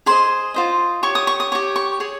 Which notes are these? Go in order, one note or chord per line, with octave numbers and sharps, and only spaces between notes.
G#4 C5 D#5 C6
F4 C5 D#5
G4 C#5 C#6
D#6
C#6
D#6
G4 C#5 C#6
C#6
G#4 C#5